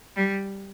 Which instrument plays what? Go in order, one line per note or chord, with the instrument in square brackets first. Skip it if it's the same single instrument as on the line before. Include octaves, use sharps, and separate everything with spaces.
[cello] G3